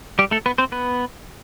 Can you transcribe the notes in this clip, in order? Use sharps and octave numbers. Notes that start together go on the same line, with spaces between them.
G3 G4
A3 A4
B3 B4
C4 C5
B3 B4